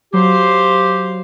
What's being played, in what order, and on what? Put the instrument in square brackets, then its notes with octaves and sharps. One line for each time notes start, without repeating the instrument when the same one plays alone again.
[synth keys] F#3 [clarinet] G4 [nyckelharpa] C5 F5